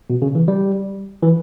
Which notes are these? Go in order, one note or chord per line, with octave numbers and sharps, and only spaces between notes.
B2
C#3
E3
G3
E3